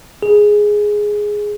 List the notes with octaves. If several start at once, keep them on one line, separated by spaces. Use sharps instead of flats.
G#4